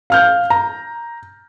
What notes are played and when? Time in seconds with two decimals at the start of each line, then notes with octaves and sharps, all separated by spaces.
0.10 F5 F6 G6
0.50 A#5